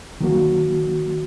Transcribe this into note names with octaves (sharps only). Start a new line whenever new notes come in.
D#3 F#3 A#3 F#4